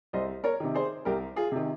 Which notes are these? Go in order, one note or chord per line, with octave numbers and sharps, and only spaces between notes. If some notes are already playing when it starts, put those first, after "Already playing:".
C2 C5 D#5
A#4 C#5
C3 D#3
G#4 C5
C2 G4 A#4
F4 G#4
C3 D#3